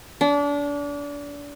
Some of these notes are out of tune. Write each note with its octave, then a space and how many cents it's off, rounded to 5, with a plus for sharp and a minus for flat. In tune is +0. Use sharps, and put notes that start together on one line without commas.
D4 -30